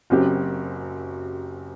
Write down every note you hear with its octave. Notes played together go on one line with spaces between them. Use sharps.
F#1 F#2 F#3 C4 G4